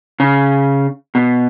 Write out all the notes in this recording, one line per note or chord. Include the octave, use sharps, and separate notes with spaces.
C#3
B2